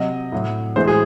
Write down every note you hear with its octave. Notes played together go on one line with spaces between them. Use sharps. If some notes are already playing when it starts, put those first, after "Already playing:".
Already playing: C3 F#3 D#5
A2 F#3
A2 E3 G#3 C5
G#4